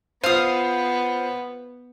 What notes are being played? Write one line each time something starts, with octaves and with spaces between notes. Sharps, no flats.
B3 F4 C5 F5 D#6